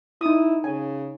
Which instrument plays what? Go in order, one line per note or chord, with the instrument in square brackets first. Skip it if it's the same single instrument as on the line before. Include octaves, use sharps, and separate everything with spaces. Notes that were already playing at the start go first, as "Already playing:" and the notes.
[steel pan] D#4 D#6 [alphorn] E4
[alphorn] C#3 [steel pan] G#5